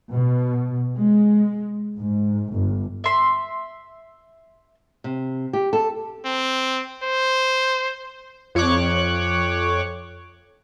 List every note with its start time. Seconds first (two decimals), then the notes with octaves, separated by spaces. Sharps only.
0.14 B2
0.97 G#3
1.97 G#2
2.51 G1
3.04 E5 C6
5.04 C3
5.53 G4
5.73 A4
6.25 C4
7.03 C5
8.55 F2 C#5 C#6 D6 F#6